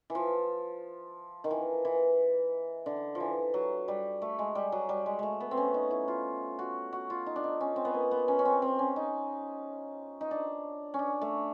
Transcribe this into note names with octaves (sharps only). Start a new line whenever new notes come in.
E3
F3
D#3
E3
E3
D3
F3
E3
F#3
G3
A3
G#3
G3
F#3
G3
G#3
G#3 A3
B3
C4
C#4
D#4
E4
F4
F#4
F#4
F4
D#4
D4
D#4
C#4
C4
B3
A#3
B3
C#4
C#4
C4
C4
C#4
D#4
D#4
D4
C#4
D4
A3